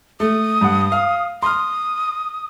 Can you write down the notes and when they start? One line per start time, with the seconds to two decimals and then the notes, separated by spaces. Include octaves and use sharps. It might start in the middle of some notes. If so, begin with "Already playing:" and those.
0.20 A3 D#6
0.61 G2 F#5
0.92 F5
1.43 C6 D#6 F6